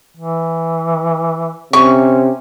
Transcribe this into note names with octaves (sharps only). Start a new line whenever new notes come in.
E3
C3 C#4 C#6